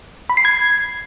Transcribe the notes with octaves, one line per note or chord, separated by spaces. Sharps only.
B5
C7
G#6